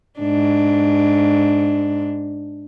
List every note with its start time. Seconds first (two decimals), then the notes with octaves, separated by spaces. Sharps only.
0.19 G#2 D4